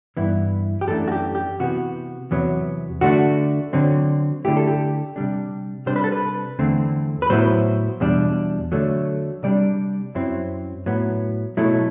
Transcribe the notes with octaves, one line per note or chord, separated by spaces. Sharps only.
G2 E3 B3 E4
G4
F#2 E3 A3 D4 A4
F#4
G4
G4
C3 E3 B3 F#4
E2 C3 F#3 B3
D3 A3 D4 F#4
D3 F#3 C4
D3 A3 E4 G4
A4
G4
C3 G3 D4
C3 G3 D4 C5
B4
A4
B4
E2 D3 A3 C4
B4
A2 F#3 B3 E4 C5
E2 B2 G3 D4
D3 F#3 A3
C3 G3 D4 D5
F#2 F#3 C4 E4
A2 F#3 B3
B2 F#3 A3 E4